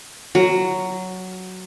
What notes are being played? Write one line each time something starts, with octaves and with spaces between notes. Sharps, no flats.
F#3